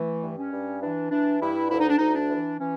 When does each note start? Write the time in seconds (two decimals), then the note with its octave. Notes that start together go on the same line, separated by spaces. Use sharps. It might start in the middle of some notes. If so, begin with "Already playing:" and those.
Already playing: E3 A3
0.23 G2
0.37 C#4
0.52 G2
0.82 E3 D4
1.11 E3 D4
1.41 G2 E4
1.71 D2 E4
1.80 D#4
1.89 D4
1.98 D2 D#4
2.15 D4
2.30 E3
2.60 E3 C#4